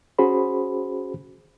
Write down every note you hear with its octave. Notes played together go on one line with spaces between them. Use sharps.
C#4 F#4 G#4 C5 B5